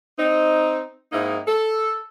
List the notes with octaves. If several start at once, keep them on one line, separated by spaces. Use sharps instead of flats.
C4 D#4
G#2 A#3 C4 D#4 E4
A4